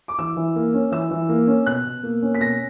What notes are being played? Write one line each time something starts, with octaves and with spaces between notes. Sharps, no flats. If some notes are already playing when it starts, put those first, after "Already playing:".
D6
E3 E6
E3
A#3
C#4
E3 E6
E3
A#3
C#4
B2 F#6
B2
A#3
C#4
B6
B2 A#6